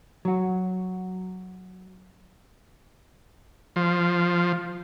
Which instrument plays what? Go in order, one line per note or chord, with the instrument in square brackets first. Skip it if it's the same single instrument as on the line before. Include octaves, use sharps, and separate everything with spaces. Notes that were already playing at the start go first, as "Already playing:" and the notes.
[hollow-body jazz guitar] F#3 F#4
[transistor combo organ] F3